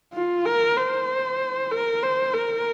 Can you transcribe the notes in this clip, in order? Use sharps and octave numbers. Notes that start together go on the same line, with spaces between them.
F4
A#4
C5
A#4
C5
A#4